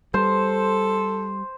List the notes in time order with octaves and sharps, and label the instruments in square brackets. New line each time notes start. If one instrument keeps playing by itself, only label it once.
[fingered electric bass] G3 [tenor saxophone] A4 [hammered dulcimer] C5